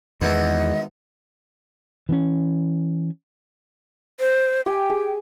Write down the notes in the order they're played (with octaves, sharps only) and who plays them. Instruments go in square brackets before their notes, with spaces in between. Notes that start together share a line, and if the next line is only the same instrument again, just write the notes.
[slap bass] E2 [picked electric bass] D#3 G#3 [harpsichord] B3 E4 [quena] D#5
[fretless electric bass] E3 C4 C#4
[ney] C5
[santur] G4 G#5 [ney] G5
[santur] G#4